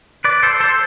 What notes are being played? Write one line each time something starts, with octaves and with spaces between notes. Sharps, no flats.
B4 D5
A4 C5
A4 C5